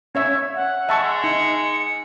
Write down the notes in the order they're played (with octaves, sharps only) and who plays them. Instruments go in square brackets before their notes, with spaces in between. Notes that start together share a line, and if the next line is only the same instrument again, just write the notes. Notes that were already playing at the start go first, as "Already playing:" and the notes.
[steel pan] C#4 C#5 E5 [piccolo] G#6
[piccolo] F#5
[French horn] G#3 [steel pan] E5 A5 C#6
[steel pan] D#4 [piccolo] C#7